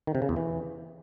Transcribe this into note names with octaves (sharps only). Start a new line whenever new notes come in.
D#3
C3
C#3
E2
E3